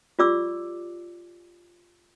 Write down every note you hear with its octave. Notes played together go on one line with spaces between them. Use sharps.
F4 G4 D5 D6 E6